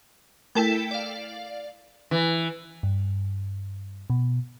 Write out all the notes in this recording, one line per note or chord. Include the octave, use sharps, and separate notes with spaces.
A3 E4 A4 A#4 G5 A5
D5 F5
E3
G2
B2